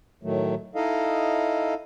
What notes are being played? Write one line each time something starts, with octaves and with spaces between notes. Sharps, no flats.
A2 D#3 F#3 A3
D#4 E4 A4 D#5 F5